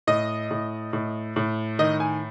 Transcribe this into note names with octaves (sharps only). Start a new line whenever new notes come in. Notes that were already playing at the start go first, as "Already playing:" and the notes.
A2 D#5
A2
A2
A2
D#3 D#5
G#5